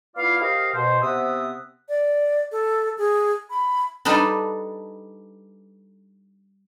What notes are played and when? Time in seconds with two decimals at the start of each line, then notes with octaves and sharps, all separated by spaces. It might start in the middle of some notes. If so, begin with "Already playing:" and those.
0.16 B3 E4 F4 D5 F5
0.40 G4 A#4 C5 D#5 F5
0.74 B2 C5
1.02 C3 B3 C5 E5 F#5 D#6
1.89 D5
2.52 A4
2.98 G#4
3.50 B5
4.05 G3 D4 D#4 A4 B4